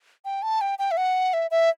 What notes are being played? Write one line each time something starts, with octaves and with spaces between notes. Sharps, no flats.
G5
A5
G5
G5
E5
F#5
E5
E5